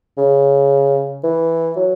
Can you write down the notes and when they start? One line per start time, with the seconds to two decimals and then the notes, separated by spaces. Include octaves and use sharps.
0.18 C#3
1.24 E3
1.76 F#3